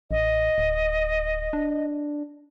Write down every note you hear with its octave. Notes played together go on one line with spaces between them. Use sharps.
A1 D#5
D1
D4